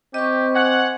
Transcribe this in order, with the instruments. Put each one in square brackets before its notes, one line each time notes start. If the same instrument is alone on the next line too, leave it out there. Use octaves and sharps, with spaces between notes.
[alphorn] C4 [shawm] G4 [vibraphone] D#5 C#6
[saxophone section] F#5 [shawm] G#5